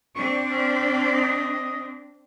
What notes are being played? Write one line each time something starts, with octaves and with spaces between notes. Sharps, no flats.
C4 D4 C#6
C#4
D#5